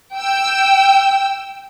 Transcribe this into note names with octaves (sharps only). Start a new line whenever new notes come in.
G5 E6